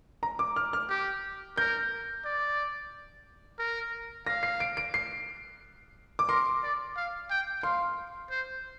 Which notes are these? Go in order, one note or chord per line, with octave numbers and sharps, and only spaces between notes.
A#5
D6
F6
F6
G4
A#4 G6
D5
A#4
F5 A#6
C7
D7
D7
C7
D6
A#4 C6
D5
F5
G5
F5 C6
C5